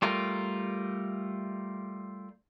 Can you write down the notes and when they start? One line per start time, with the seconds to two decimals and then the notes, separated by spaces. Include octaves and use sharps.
0.02 G3 A3 F4 A#4